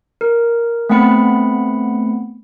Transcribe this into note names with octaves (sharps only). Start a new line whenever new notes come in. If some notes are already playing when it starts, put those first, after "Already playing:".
A#4
A3 B3 C4 F#5 B5 C#7